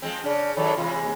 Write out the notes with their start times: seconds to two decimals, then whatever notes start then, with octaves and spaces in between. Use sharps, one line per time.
0.02 F3 G#3 C4
0.24 C#3 D4
0.57 D#3 F3 F#3 A4 C#5 D5
0.78 C3 E3 G#3 F4
0.99 D#2